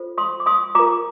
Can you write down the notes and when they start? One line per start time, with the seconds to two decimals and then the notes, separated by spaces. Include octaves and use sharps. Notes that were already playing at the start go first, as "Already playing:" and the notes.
Already playing: F4 A4 C5
0.18 C6 D#6
0.40 D6
0.46 C6 D#6
0.75 F4 A#4 A#5 D6